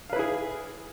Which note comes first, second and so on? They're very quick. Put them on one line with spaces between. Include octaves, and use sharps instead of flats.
F5 B4 E4 G#4